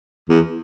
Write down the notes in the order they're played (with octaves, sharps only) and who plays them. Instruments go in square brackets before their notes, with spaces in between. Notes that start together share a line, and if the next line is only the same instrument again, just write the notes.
[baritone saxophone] E2